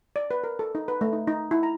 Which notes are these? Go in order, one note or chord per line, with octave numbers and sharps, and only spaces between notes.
D5
B4
A#4
A4
D#4
B4
A3
D#4
D#4
E4
A#5